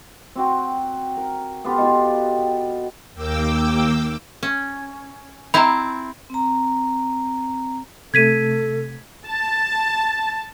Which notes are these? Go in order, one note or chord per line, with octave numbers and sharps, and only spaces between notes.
C4 F#4 G5
A#4
B3 F4 G4 A4
B2 F4
D#2 A#3 G5 D6 E6
C#4
C4 E4 A#5 B5
C4 A#5
C3 A3 A4 G#6 B6 D#7
A5